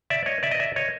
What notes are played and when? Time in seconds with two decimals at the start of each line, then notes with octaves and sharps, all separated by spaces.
0.10 D5 E5
0.26 C#5 D#5
0.43 D5 E5
0.51 D#5
0.60 D5 E5
0.76 C#5 D#5